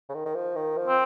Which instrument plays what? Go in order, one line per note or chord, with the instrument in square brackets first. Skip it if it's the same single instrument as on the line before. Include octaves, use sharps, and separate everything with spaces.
[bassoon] C#3
D#3
D#3
F3
D#3
F3
[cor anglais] C4